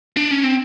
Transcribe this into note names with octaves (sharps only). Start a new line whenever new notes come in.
D4
C#4
C4